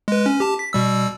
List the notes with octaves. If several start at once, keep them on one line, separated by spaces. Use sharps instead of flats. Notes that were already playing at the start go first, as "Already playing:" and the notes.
G#3 B4
C#4
G4 A5
B6
B2 G3 E6